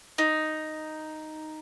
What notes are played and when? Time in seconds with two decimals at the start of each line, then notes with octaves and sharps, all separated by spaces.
0.18 D#4